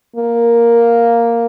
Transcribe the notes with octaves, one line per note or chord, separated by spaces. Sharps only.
A#3